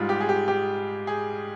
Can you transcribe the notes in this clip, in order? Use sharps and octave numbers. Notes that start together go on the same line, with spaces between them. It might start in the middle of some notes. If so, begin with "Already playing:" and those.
Already playing: G#2 G3 F4
G4
G#4
G4
G4
G#4